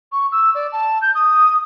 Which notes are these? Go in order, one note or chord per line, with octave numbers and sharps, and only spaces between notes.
C#6
E6
D5
A5
G6
D#6